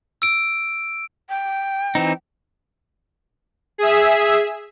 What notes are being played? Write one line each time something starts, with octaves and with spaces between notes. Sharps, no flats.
E6 D7
G5
E3 C4 D#4
G#4 E5